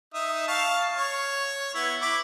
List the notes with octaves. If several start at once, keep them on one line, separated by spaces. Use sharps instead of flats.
D#4 E5 D#6
F5 A5 C#6
C#5
B3 E4
E4 D6